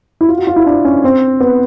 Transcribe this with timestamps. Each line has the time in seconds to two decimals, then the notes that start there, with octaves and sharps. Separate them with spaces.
0.21 E4
0.29 F4
0.38 F#4
0.47 F4
0.56 E4
0.66 D4
0.85 C#4
1.04 C4
1.40 B3